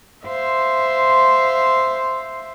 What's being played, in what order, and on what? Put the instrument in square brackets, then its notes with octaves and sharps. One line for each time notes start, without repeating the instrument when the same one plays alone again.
[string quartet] C5 E5 F5 C6